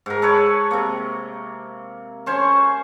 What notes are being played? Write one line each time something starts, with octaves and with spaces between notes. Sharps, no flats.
G#2 A#4
A4 B4 C#5
C3 A#3
C#4 C5 C#5